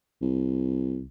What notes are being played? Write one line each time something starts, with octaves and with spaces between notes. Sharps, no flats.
C2